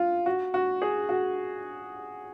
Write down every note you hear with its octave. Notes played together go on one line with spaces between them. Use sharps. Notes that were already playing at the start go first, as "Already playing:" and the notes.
Already playing: F4
F#4
F#4
G#4
F#4